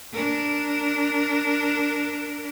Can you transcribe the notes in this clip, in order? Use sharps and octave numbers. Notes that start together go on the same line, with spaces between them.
D4 A#4